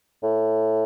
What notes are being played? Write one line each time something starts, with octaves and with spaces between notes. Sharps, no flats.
A2